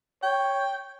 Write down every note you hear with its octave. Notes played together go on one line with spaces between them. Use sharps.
C#5 G5